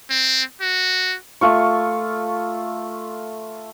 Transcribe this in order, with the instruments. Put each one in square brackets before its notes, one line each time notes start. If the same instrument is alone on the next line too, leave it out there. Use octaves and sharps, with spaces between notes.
[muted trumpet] C4
F#4
[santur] A3 F4 C#6